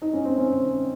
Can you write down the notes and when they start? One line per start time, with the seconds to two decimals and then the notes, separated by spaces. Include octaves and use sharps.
0.02 D#4
0.13 C#4
0.25 C4
0.37 C#4